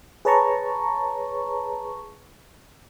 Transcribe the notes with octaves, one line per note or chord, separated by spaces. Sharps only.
G#4 B4 C#5 A5 A#5 C#6